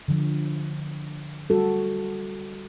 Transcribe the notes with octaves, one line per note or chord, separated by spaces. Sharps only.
D3 F3
G3 F#4 A4